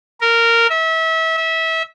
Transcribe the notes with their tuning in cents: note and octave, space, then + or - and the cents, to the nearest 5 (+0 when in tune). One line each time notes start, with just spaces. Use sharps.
A#4 -10
E5 -30
E5 -25